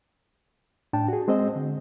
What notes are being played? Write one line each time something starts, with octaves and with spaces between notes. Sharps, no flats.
A2 D4 G5 A5
F#4 G#4
G#3 C4 C5 D#5
D3